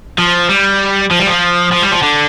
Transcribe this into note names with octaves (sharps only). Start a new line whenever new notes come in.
F3
G3
F3
G3
F3
F3
G3
F3
D3